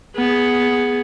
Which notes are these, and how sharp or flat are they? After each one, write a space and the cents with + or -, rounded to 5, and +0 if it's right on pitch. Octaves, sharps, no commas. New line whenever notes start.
B3 +0 G#4 +0